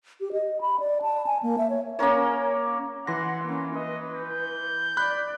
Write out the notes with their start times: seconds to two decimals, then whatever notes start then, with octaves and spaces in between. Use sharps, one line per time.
0.21 G4
0.33 D#5
0.61 B5
0.80 D5
1.02 A5
1.27 G#5
1.43 A#3
1.58 E5
1.70 C#5
1.99 A#3 C#4 A#4 C#5
3.07 E3 F#5 C6 A#6
3.44 A#3 C#4
3.75 B4 D#5
4.14 G6
4.97 D5 B5 F#6